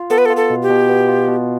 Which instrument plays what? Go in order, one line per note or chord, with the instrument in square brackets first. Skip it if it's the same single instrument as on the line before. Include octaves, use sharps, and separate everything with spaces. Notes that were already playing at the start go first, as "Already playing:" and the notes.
Already playing: [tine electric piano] F4
[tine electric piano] B3 [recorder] A4
[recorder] B4
A4
[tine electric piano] F4
[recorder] A4
[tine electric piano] B2
[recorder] G4
[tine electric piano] B2
B3
F4
B2